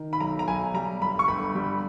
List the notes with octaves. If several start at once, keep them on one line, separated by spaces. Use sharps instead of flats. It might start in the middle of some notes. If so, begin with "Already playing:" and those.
Already playing: D#3
B5
B1 A#5
A#5
B1 G#5
G3 A#5
G1 B5
C#6
G1 B5
G3